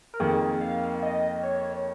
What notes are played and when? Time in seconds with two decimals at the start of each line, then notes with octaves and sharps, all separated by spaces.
0.14 A#4
0.20 F2 D#3 A#3 G#4
0.61 F5
1.03 D#5
1.43 C#5